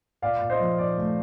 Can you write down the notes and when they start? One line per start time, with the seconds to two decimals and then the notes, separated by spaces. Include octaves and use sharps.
0.22 A#2 D5 F5
0.40 A#2
0.50 C5 D#5
0.60 F3
0.78 A#2 D5
0.98 A3